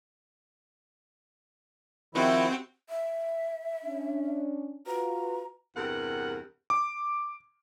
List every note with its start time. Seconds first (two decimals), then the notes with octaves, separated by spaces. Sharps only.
2.15 D#3 F3 C4 E4 F#4 G4
2.89 E5
3.85 C#4 D4
4.87 F4 F#4 B4 A#5
5.76 E2 G2 C3 A#4 F#5
6.70 D6